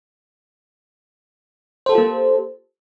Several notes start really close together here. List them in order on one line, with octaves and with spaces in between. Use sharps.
C5 A4 G4 F4 A#3